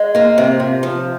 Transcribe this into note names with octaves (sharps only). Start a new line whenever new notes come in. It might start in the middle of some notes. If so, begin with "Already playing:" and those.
Already playing: G#3
A#3 F4
C3
C3
F3